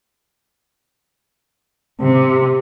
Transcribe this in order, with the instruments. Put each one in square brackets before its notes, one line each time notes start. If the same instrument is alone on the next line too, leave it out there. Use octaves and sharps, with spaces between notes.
[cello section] C3